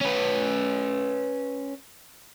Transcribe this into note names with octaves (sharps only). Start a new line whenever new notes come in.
C#4 B4